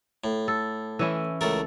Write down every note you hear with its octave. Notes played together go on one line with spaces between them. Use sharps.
A2
A4
E3 C#4 E4
C#2 A3 A4 A#4